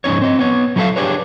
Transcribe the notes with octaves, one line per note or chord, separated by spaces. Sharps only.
F2 G#2 C#4 D#4 C#5
C4 D#5
B3 C#5
F#3 D#4 E4 A4 E5 F5
D4 G4 G#4 B4 C#5